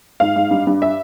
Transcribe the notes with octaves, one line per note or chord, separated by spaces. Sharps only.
G#2 F5
G#2
G2
G2
E5